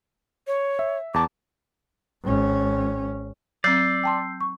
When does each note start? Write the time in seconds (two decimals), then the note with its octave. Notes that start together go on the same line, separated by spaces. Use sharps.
0.47 C#5
0.79 E5
1.14 E2 A5 D6
2.23 G#1 C#4
3.64 F#3 C4 D5 E6 G6 C7
4.04 G5 A5 C6
4.41 C#6